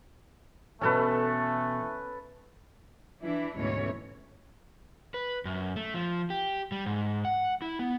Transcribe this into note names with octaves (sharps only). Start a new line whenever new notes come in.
B2 E3 A3 C#4 A4 B4
E3 D4 E4
D2 G#2 B2 E3 C#4 C#5
B4
F#2
A3
F3
G4
G3
G#2
F#5
E4
B3